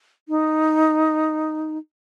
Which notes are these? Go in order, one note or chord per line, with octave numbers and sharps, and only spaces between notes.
D#4